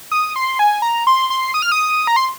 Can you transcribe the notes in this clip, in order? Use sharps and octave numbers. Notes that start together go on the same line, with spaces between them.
D#6
C6
G#5
A#5
C6
C6
D#6
F6
D#6
A#5
C6